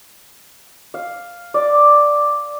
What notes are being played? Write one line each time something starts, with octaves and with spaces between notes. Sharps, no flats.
F5
D5